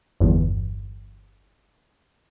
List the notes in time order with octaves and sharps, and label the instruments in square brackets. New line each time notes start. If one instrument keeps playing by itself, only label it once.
[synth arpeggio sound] G1 E2